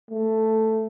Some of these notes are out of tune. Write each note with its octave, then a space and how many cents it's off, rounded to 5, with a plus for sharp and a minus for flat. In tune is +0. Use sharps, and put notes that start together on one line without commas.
A3 +5